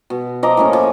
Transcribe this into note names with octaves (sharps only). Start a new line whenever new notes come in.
B2
F3 D#5 A#5 D6
A2 A#3 C#4
F3